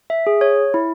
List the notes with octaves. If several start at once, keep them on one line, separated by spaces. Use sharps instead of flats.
E5
G#4
C#5
E4